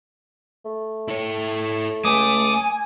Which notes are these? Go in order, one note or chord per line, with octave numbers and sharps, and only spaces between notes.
A3
E4 C#5
C#2 A3 G#5 D6 D#6